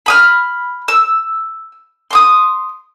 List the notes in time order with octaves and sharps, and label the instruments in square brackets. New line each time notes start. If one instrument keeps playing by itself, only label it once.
[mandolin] B5 D#6 F6
E6
C6 D6 D#6